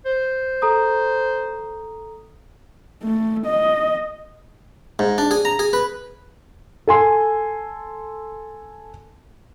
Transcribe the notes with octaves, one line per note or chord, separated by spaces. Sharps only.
C5
A4 A#5 D#6
A3
D#5
G#2
D4
G#4
A#5
G#4
B4
A4 G#5 C6